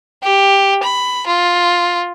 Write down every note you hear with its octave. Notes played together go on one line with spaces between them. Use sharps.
G4
B5
F4